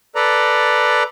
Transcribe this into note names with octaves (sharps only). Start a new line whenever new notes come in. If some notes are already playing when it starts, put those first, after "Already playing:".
A4 B4 D5 A#5